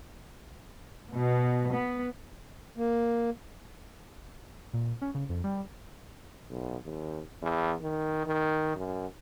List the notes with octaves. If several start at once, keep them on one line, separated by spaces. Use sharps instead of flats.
B2
B3
A#3
A#2
C#4
C#3
F2
G3
B1
D#2
E2
D#3
D#3
F#2